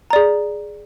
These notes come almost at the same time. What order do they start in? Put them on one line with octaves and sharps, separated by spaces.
A#5 D5 G#4